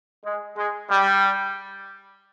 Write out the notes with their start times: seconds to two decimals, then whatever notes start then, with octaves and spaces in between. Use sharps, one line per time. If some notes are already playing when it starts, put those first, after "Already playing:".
0.25 G#3
0.57 G#3
0.90 G3